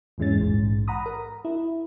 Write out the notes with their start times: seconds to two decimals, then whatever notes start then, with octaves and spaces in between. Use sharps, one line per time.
0.18 E2 G#2 E3 G#3 C#4 A6
0.38 A#1 G#2
0.88 F#5 A#5 B5 D#6
1.06 A#4
1.45 E4